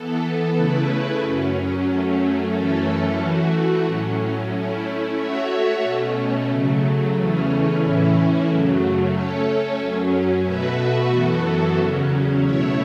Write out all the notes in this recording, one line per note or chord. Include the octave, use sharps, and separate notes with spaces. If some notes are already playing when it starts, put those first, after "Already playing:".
Already playing: E3 B3 A4
C#3 A3 E4 B4
F#2 F#3 C#4
F#2 F#3 A3 C#4
F#2 E3 A3 C#4 A4
E3 A3 F#4
A2 F#3 C#4
A3 C#4 E4
A3 F#4 C#5 E5
B2 A3 C#4
C#3 F#3 A3
E2 C#3 E3 A3 C#4
A2 E3 C#4 E4
F#2 C#3 F#3 A3
A3 C#4 A4 C#5
F#2 F#3 C#4
B2 A3 F#4 B4 E5
F#2 E3 B3 F#4 A4
E2 C#3 F#3 C#4
B2 A3 E4 C#5 E5